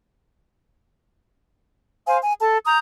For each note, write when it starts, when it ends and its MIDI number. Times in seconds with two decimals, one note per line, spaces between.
2.07 2.17 72
2.07 2.17 77
2.07 2.17 80
2.22 2.34 80
2.40 2.58 69
2.40 2.58 81
2.65 2.79 82
2.65 2.79 87
2.65 2.79 91